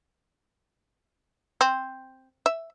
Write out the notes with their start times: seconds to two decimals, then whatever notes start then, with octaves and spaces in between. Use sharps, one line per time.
1.61 C4
2.46 E5